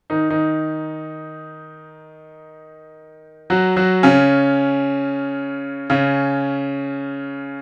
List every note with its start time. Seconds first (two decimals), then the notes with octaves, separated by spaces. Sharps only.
0.10 D#3 D#4
0.30 D#3 D#4
3.50 F#3 F#4
3.76 F#3 F#4
4.03 C#3 C#4
5.90 C#3 C#4